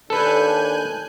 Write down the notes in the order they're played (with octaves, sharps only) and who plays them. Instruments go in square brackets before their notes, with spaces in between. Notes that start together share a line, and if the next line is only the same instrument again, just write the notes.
[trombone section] D#2 D4 [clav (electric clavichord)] A4 B4 [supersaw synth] G#5 F#6 G6